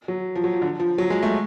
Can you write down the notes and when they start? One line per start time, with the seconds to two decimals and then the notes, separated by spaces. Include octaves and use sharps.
0.08 F#3
0.35 F3
0.44 F#3
0.53 F3
0.62 D3
0.80 F3
0.98 F#3
1.10 G#3
1.23 A3